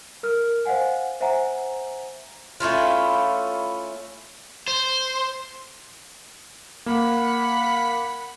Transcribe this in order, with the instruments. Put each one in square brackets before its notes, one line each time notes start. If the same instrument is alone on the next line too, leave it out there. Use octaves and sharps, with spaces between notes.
[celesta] A#4 F6
C5 D#5 F5 F#5 G#5
C5 E5 F#5 G#5 A#5
[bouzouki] A3 C#4 E4 F4
[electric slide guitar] C5
[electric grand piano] A#3 [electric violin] F#5 B5